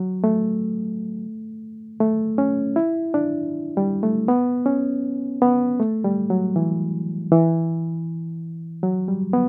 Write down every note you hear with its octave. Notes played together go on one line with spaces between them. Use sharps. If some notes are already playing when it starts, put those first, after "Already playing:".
Already playing: F#3
A3
A3
C#4
E4
D4
G3
A3
B3
C#4
B3
A3
G3
F#3
E3
E3
F#3
G3
B3